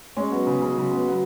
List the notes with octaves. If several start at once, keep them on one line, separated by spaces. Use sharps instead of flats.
G#3 C#4
F#3 B3
C#3
C#3
C#3 F#3
F#3 B3
F#3 B3